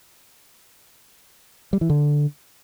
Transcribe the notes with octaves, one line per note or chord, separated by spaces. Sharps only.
G3
E3
D3